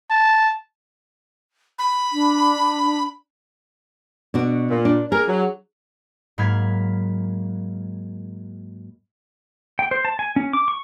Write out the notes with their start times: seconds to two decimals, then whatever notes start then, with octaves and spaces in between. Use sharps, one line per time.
0.11 A5
1.79 B5
2.12 D4
4.34 B2 D4 F#4
4.70 A#2
4.85 D4
5.12 G#4 A#4
5.28 F#3
6.38 G#2 F#3 A#3 B5 F6 G#6
9.79 G5
9.91 C5
10.05 A5
10.19 G#5
10.36 C#4
10.53 D6
10.68 C#6